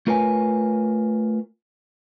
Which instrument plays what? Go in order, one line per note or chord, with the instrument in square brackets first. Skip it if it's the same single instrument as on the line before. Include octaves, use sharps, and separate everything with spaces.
[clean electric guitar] A3 F4 A#4 B4 C#5 G#5